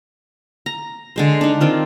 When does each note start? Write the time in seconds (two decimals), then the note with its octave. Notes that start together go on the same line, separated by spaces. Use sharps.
0.66 A#5
1.16 D3 G#3 C5
1.41 D4 D#4
1.61 D#3 C4 F4